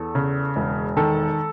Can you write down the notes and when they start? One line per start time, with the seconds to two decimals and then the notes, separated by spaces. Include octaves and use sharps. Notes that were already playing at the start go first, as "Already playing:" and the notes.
Already playing: E2 A4
0.15 C#3
0.56 E1
0.97 D#3 A4